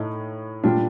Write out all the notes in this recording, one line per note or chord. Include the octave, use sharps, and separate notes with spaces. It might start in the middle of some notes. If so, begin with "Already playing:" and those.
Already playing: A2 A3 D#4
A#2 G3 D4 F4